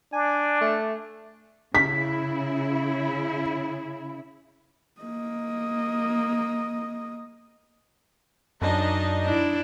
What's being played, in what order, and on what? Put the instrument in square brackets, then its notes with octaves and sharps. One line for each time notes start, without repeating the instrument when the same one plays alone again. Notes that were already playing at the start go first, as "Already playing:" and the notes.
[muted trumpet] D4 [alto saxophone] G#5
[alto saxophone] A3
[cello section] C#3 E4 [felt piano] B6
[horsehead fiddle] A#3 D#5
[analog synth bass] F#2 [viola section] D4 D#4 D#5
[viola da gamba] D4 E4